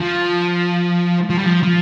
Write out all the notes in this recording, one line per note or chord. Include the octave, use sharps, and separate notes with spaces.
F3
F3
G3
F3
F3